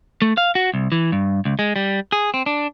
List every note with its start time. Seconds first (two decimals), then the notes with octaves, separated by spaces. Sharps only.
0.22 A3
0.37 F5
0.55 F#4
0.74 C2
0.92 E3
1.12 G2
1.45 C#2
1.59 G#3
1.76 G3
2.12 G#4
2.34 C4
2.46 D4